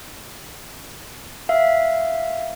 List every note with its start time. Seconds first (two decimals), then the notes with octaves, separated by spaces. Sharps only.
1.49 E5 F5